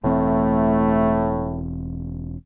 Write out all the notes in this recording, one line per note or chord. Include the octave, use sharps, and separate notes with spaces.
E1 A2 E3 A3 C4